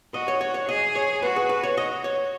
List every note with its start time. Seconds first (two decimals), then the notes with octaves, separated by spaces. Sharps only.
0.14 F#4 D#5
0.28 C#5
0.41 C#5
0.54 C#5
0.68 G#4 D#5
0.96 C#5
1.23 F#4 B4
1.36 G#4
1.49 B4
1.63 C#5
1.77 F#4 D#5
2.04 C#5